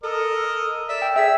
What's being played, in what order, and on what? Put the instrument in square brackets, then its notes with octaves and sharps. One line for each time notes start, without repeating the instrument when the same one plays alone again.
[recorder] A4 [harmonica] A#4 D#5
[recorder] D5 [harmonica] E5
[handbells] G5
[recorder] G#4 [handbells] E5 B6 [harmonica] E6